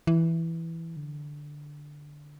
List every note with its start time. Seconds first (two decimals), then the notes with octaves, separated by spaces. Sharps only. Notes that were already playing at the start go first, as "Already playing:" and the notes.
0.07 E3
0.96 D3